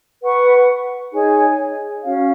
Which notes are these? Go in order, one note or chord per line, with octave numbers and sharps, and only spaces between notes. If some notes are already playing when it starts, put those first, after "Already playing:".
B4 F#5 C#6
D#4 G#4 C#5 G#5
C#4 F#4 C#5 F5